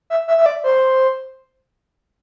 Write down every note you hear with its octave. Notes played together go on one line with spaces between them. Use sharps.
E5
E5
E5
D5
C5